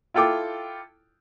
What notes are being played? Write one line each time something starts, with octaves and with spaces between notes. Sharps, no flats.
E4 F4 A4 G5 D6